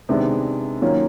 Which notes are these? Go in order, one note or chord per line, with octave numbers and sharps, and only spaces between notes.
C3 D#3 G#3 B3 D4
D#3 F#3 A#3 C#4 F4